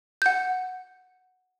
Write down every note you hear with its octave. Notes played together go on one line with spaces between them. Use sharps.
F#5 G6